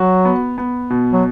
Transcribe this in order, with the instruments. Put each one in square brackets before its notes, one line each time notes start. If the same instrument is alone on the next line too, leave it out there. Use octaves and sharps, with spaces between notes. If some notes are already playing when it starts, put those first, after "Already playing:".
Already playing: [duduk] F#3 [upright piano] F#4
[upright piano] B3
B3
B2
[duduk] F#3